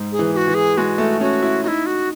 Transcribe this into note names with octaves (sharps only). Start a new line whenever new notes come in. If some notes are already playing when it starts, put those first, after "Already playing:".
Already playing: G#2
G#4
E3
G#4
F#4
E3
G#4
G#3 F#4
A3
C#4 F#4
E4
D#4 E4 F#4
F#4